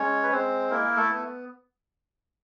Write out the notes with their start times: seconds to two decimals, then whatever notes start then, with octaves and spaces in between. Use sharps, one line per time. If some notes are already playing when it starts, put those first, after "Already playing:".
Already playing: G#3 C#4 C#5
0.23 B4
0.32 G#3 C4 C5
0.71 A#3 E4 A#4
0.97 A3 A4
1.10 B3